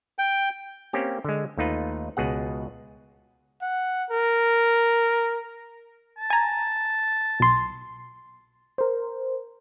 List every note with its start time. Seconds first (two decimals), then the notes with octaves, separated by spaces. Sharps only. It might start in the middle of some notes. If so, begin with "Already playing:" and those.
0.19 G5
0.93 A#3 C4 C#4 G4
1.25 D3 G#3
1.58 D#2 A3 D#4 F4 B4
2.17 C#2 B2 G#4 F#5
3.62 F#5
4.11 A#4
6.18 A5
6.30 G#5 A#5
7.40 B1 C6
8.78 A#4 C5